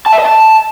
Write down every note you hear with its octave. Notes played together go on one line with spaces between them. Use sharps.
A5
E5
D#5
A5